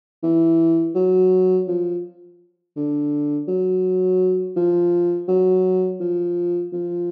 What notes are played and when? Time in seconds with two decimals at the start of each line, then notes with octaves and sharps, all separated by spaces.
0.23 E3
0.95 F#3
1.68 F3
2.76 D3
3.48 F#3
4.56 F3
5.28 F#3
6.00 F3
6.73 F3